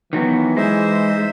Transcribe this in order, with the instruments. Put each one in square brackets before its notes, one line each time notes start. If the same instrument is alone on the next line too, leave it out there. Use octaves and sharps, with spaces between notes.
[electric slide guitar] D#3 F#3 B3 [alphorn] E3
[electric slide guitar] G#3 [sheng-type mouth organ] D#4 C5 E5